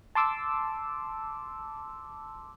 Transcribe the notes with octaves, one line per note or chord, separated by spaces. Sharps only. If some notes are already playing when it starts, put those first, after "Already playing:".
A5 C6 D6 E6